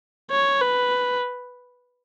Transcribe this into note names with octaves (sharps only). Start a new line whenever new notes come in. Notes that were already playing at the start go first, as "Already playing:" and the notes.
C#5
B4